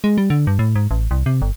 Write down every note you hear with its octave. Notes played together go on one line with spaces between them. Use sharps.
G#3
G3
D3
G2
A2
G#2
A1
C2
C3
G1